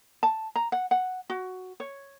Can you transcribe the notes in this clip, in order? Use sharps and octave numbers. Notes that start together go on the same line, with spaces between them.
A5
A#5
F#5
F#5
F#4
C#5